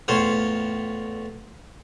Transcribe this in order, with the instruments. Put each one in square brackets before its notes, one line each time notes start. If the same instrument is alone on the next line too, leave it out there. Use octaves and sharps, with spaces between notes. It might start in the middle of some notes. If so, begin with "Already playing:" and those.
[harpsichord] E2 A2 F4 C5 C#5